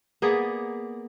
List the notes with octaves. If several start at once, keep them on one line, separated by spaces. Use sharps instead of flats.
A#3 B3 G#4 D5